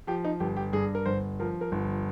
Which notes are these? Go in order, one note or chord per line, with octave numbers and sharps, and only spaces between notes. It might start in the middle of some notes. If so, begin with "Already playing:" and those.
F3 G4
D#4
G1 G4
G4
G2 G#4
A#4
G1 C5
F3 A#4
A#4
G1